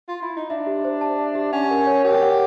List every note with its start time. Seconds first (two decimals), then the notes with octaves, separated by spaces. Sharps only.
0.08 F4
0.22 E4
0.36 D#4
0.50 D4 E5
0.67 G4
0.84 C5
1.01 A5
1.19 E5
1.35 G4
1.53 C#4 F#5
1.71 A#4
1.87 C#5
2.04 G4 A#4
2.22 F#5